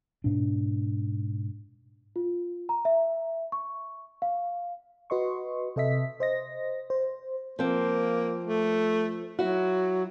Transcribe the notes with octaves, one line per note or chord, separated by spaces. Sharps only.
G#2 B2 D4
F4
A#5
E5
C#6
F5
F#4 B4 D#5 C6 C#6
C3 A4 D#5 E5 B6
C5 D#5 A#6
C5
F3 A#3 C4
A3
F#3 E4 F#4